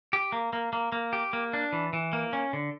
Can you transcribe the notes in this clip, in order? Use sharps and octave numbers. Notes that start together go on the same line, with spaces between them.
G4
A#3
A#3
A#3
A#3
G4
A#3
D4
E3
E3
A#3
C#4
D3